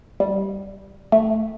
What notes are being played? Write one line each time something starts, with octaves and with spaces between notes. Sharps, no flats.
G3
A3